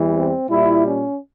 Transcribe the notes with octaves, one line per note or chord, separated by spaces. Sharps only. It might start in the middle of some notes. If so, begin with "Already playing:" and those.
Already playing: E2 E3 G3
C4
A#2 G3 E4
C#4